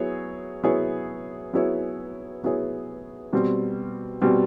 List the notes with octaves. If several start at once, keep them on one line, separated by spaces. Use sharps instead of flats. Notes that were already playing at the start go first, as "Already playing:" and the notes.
Already playing: F#3 B3 E4 G#4 C#5
F#3 B3 E4 G#4 C#5
F#3 B3 E4 G#4 C#5
F#3 B3 E4 G#4 C#5
B2 G3 C4
B2 G3 C4